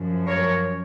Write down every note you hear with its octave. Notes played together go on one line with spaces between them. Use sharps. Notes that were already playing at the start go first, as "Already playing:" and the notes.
Already playing: F#2 F3
A#4 C#5